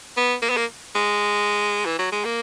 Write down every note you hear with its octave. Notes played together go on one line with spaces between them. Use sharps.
B3
A#3
B3
A#3
G#3
E3
F#3
G#3
A#3